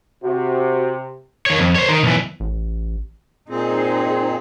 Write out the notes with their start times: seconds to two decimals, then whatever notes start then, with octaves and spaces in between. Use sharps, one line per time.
0.24 C3 F#4
1.46 D#3 C#5
1.59 F2
1.76 C5 C#5
1.89 D#3
2.03 B1 E3
2.40 A1
3.49 A#2 C4 D#4 G#4 C5